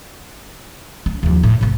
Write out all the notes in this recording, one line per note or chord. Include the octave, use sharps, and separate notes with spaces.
C#4
D#2 F3
A2
B1 G#2